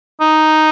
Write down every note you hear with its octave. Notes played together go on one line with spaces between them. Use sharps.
D#4